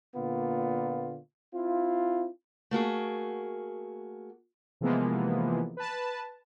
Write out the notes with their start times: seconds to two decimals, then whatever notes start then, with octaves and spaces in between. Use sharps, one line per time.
0.15 A#2 D3 A#3 B3 F4
1.54 C4 E4 F4
2.71 A3 A#3 F#4 G#4
4.81 C3 E3 F3 G#3 A#3 B3
5.77 B4 A5